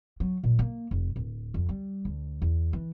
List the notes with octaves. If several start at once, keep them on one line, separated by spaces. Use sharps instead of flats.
F#3
A#2
A#3
F1
D1
F2
G3
D2
E2
E3